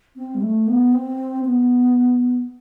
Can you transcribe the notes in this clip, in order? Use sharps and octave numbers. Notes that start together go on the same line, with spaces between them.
C4
G3
A3
B3
C4
B3